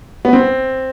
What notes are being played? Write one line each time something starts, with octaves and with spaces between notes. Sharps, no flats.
B3
C4